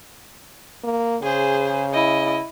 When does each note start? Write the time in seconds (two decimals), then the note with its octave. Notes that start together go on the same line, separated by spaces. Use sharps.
0.84 A#3
1.22 C#3 G#4 C5
1.93 E4 D#5